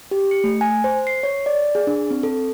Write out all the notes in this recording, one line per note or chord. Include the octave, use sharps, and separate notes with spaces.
G4
C#7
A3
G#5
C5
C7
C#5
D5
G#4
D4
C4
A4